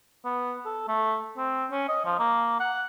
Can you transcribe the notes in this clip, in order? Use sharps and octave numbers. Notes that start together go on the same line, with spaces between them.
B3
A4
A3
C4
C#4
D#5
F3
A#3
F#5